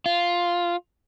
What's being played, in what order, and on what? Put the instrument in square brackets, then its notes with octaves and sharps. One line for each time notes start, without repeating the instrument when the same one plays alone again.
[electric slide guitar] F4